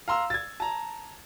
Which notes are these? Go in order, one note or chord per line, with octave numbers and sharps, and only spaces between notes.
F5 A#5 C6 E6
G#6 A6
A5 A#5